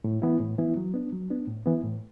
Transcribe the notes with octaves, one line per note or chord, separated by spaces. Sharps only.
A2
E3 B3 E4
A2
E3 B3 E4
F#3
B3 D4
F#3
B3 D4
A2
E3 B3
A2